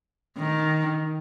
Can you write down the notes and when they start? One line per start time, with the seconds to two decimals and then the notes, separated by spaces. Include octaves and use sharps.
0.38 D#3